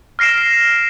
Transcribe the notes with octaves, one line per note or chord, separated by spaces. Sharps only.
F6 A#6 C7 D7 E7